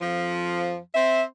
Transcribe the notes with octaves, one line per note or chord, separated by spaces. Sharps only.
F2 F3
C4 C5 E5